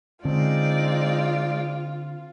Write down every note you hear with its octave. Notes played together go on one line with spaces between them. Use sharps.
D3 G#3 C4 C#4 D#4 F4 D5